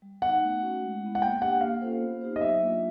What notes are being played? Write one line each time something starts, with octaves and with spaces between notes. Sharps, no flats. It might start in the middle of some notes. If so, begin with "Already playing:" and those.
G3
B3 D#4 F#5
A3
C#4 F#4
G#3
B3 E4
F#5
A#3 G5
D4 G4 F#5
A#3 F5
C#4 F4 A4 C5
B3
D#4 G4 C5
D#5
F#3 E5
A#3 D4 F4